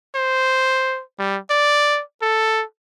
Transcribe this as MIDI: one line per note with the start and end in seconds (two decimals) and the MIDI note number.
0.15 1.02 72
1.19 1.38 55
1.50 2.02 74
2.22 2.64 69